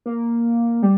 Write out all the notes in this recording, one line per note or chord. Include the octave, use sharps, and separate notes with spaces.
A#3
G3